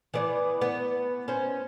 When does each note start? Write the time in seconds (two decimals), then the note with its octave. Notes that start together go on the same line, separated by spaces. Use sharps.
0.14 E3 B3 D5
0.61 B3
1.28 C#4 C5